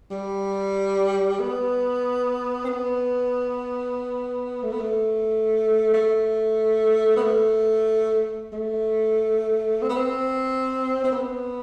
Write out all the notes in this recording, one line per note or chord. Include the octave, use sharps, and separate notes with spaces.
G3
B3
C4
B3
A3
B3
A3
A3
B3
A3
A3
C4
B3
C4
C4
B3